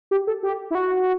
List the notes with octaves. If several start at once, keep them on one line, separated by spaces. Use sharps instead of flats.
G4
A4
G4
E4
F#4